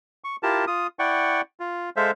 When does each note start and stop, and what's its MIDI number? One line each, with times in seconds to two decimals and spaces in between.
0.24 0.36 85
0.43 0.65 64
0.43 0.65 65
0.43 0.65 67
0.43 0.65 70
0.43 0.65 81
0.67 0.87 65
0.67 0.87 87
0.99 1.41 64
0.99 1.41 74
0.99 1.41 78
0.99 1.41 79
0.99 1.41 85
1.60 1.90 65
1.96 2.11 56
1.96 2.11 69
1.96 2.11 72
1.96 2.11 76
1.96 2.11 77